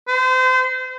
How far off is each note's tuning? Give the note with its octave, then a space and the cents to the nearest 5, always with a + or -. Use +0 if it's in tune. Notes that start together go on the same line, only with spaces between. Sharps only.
C5 -30